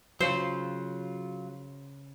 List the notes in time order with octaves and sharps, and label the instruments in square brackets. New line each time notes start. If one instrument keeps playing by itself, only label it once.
[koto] C#3 C5 [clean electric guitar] F#3 F4